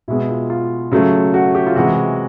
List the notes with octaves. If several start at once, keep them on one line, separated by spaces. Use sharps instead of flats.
B2 G#3 B3 E4
F4
F4
C#3 F#3 A3
F#4
G4
F4
C3 E3 G#3 F#4